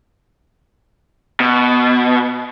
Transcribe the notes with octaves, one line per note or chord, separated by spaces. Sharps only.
B2